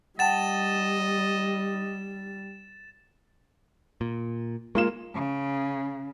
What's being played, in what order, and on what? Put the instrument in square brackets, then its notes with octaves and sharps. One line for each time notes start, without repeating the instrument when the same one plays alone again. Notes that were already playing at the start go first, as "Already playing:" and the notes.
[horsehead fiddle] G3 [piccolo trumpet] D#5 [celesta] F#5 G5 A5 [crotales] A6 E7
[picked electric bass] A#2
[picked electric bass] G#3 [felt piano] A#3 F4 E7
[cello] C#3